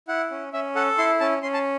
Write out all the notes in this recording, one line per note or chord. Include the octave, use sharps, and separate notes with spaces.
E4 F#5
C#4
C#4 E5
A4 F#5
E4 C6
C#4 A5
C#4 C6
A5